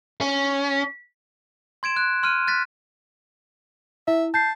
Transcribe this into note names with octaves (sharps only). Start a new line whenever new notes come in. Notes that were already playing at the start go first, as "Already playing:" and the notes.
C#4
C6 G#6 D7 E7
F#6
C6 F6 F#6 D#7
F#6 A6 B6
E4 E5
A5 G6 C7